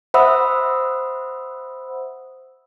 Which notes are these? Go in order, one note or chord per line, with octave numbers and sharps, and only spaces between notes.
C5 E5 F#5 B5 D#6 E6